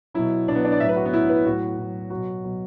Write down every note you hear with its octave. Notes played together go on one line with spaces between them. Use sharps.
B2 F#3 E4
B2 F#3 B3 D4
D4
D5
A2 F#3 E5
B4
F#4
B3
A2 F#3 E4
B4
A2 F#3 F#4
A2 F#3
B2 F#3 F#4
B2 F#3